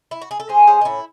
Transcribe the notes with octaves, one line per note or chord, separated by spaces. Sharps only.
E4
F#4
G#4
A4
G#3 G#4 C5
C#4 G#4 C5
D#4
A2 E4